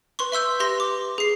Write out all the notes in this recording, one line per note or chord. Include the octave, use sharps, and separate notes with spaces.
B4 C6 C#6
E5 C6 E6 G6
G4 B4 C6 A#6 G7
D6
G#4 C7